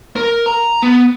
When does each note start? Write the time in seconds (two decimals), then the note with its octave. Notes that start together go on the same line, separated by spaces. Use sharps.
0.16 A#4
0.46 A#5
0.82 B3